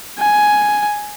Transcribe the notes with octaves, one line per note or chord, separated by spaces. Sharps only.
G#5